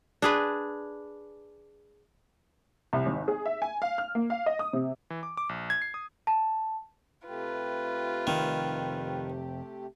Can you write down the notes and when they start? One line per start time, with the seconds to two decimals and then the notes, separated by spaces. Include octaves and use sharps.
0.22 D4 G#4 B4
2.93 C2
3.06 G#1
3.28 G#4
3.46 E5
3.62 G#5
3.82 F5
3.98 F6
4.15 A#3
4.30 F5
4.46 D#5
4.59 D#6
4.73 C3
5.10 E3
5.23 D6
5.37 D6
5.49 A#1
5.70 G#6
5.82 C7
5.94 D#6
6.27 A5
7.27 C3 A3 F4 G4 B4
8.27 F1 D#3 C4